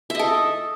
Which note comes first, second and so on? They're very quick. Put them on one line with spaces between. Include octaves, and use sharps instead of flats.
E5 D#5 A4